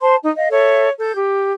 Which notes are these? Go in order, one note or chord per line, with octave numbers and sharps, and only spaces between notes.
C5 A5 C6
D#4
D#5 F5
A4 C#5 E5
A4 G6
G4